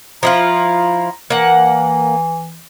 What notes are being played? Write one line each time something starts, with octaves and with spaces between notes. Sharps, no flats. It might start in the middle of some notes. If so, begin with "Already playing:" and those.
F3 E4 F4 A#5
E3 A#3 F#5